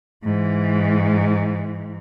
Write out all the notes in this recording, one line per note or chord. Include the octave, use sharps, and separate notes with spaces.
G#2 E3